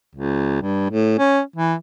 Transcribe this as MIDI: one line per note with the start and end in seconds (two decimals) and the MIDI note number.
0.15 0.59 37
0.62 0.87 43
0.90 1.18 45
1.19 1.41 61
1.56 1.75 52